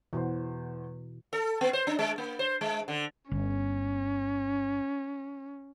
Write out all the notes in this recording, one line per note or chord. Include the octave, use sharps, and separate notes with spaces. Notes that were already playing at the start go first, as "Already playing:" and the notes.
E2 B2 E3 F#4 C5
A4
B3
C5
D4
G#3
A#3
C5
G#3
D3
G1 C#4